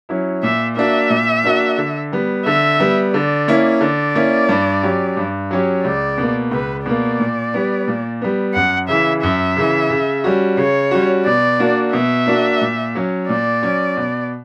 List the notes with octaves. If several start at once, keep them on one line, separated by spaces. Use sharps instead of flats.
F#3 C#4 E4
A#2 E5
A#3 D4 F#4 E5
A#2
A#3 D4 F#4
D3
G3 B3
D3 E5
G3 B3
D3 D5
A#3 C#4 E4
D3 D5
A#3 C#4 E4
G2
F#3 C#4 G4
G2
F#3 C#4 G4
C#2 D5
B2 A#3
C#2 B4
B2 A#3 D5
A#2
G3 B3
A#2
G3 B3
F#2 F#5
C#3 E3 E5
F#2 E5
C#3 E3
C#3
G3 C#4 F#4
C#3 C#5
G3 C#4 F#4
B2 D5
A#3 D4 F#4
B2 E5
A#3 D4 F#4
A#2
F#3 C#4
A#2 D5
F#3 C#4
B2